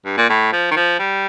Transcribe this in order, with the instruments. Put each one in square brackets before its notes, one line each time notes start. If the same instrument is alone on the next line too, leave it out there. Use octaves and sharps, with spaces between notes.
[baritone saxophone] G2
A#2
A2
F3
D#3
F3
G3